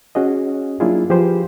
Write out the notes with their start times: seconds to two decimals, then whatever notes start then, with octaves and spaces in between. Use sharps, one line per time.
0.15 C#4 F#4 G#4 D#5
0.80 F#3 A#3 D4 E4 F4 G#4
1.10 F3 G4 G#4 B4 C5